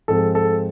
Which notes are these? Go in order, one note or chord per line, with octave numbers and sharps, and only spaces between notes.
G#2 F3 G#3 C4 A4
A4